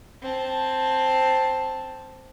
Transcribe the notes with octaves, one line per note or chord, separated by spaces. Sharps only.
C4 A5